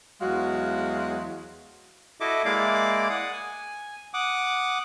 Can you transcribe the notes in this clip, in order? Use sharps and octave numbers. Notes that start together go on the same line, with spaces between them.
E2 F#3 G#3 F#4 F5
E4 F#4 A4 D#5 E5 D6
G#3 A#3 E4 D5 F5 D6
F#5 D#6
G#5
F#5 D6 D#6